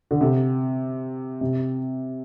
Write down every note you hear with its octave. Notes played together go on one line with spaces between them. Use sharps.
D3
C3
C3